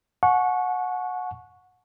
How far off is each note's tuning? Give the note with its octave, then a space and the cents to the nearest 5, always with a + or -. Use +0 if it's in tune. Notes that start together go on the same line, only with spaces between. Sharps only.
F#5 -20 A5 -45 C#6 +0